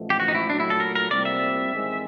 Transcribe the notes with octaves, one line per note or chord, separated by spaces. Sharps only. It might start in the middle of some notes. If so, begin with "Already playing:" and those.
Already playing: A1 G#2 F3 A3
G4
F#4
D#4
E4
A#2 F#3 A3 D4
E4
A4
A#4
A#4
C2 A#2 G3 C4 D5
E5
A1 G#2 D#3 G#3 C4